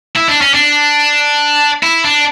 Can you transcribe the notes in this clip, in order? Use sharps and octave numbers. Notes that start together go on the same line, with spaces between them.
E4
D4
C#4
D4
E4
D4